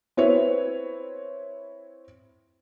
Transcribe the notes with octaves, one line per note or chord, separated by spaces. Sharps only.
C4 E4 B4 C#5